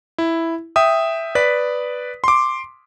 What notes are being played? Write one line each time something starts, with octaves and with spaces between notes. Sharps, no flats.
E4
E5 G5 D#6
B4 D5 B6
C6 D6